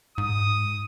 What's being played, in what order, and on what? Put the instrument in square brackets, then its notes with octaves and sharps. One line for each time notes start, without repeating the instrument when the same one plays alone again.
[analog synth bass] G#2 [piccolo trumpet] D#6